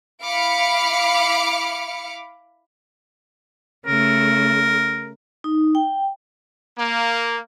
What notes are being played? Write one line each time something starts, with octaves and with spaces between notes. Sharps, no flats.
E4 F5 B5 D6 F6 C#7
C#3 A3 A#4
D#4
G5
A#3